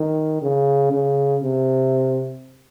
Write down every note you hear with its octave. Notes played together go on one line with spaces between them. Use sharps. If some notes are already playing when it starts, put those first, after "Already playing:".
Already playing: D#3
C#3
C#3
C3